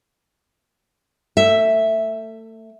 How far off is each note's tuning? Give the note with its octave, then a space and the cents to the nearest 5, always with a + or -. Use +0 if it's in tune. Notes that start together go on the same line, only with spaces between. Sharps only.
A3 +30 E5 +0